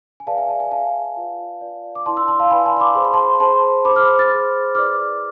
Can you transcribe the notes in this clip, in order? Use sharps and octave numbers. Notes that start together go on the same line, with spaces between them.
G#5
G#4 B4 D5 F5 A5
E5 G#5
F5 A5
E5 G#5
G#4 B4 D5 F5 A5
F4 B4 D5
F4 B4 D5
D6
E4 B4 D5 A5 C6
C6 E6
A5 C6
F5 A5
E4 B4 D5 G#5 B5
A5 C6
C6
B5 D6
G#4 C5 C6
B5
A5 C6
G#4 C5 A5 C6
G#4 C5 B5 D6
D6 F6
F6 A6
G#4 C5
E4 G#4 B4 D5 D6 F6